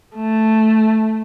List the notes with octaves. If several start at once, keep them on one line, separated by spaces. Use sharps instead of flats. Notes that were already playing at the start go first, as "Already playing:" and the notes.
A3